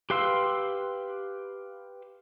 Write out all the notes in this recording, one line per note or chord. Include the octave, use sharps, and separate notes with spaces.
G4 B4 F5 C6 E6